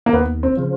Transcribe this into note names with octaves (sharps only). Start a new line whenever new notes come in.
A#3
D#2 B3
C4
C#3 F3